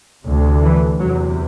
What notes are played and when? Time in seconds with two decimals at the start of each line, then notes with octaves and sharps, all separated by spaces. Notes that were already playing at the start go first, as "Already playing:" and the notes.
0.26 D2 C3
0.63 E3
0.99 E2 C3 F#3